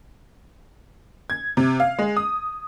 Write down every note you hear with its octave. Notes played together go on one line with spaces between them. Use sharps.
G#6
C3
F5
G#3
D#6